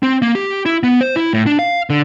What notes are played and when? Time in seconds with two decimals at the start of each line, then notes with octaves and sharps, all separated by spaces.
0.03 C4
0.22 A#3
0.35 G4
0.66 E4
0.83 B3
1.01 C5
1.16 E4
1.33 A2
1.46 D4
1.59 F5
1.90 D3